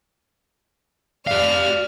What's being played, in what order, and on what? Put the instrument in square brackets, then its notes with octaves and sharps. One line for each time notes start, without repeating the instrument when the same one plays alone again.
[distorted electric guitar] G4 F5 [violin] D5 F6